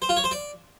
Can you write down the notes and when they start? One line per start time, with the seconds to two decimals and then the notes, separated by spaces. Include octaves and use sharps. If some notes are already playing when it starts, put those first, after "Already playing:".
0.02 C5
0.09 F4
0.17 C#5
0.24 C5
0.31 D5